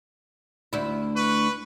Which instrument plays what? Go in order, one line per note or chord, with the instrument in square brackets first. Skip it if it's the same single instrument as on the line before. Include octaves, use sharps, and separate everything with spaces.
[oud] D2 E4
[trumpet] B4 [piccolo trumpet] C#6